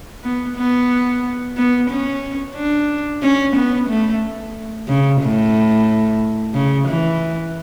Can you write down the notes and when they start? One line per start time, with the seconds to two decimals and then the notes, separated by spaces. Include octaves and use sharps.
0.23 B3
0.57 B3
1.57 B3
1.90 C#4
2.56 D4
3.22 C#4
3.56 B3
3.89 A3
4.88 C#3
5.22 A2
6.54 C#3
6.88 E3